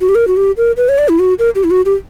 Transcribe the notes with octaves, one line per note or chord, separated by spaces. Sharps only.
F#4
G4
A#4
F#4
G4
A#4
B4
C#5
D5
E4
F#4
A#4
G4
E4
F#4
G4